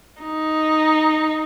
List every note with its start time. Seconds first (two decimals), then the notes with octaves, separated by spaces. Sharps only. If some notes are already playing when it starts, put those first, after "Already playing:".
0.22 D#4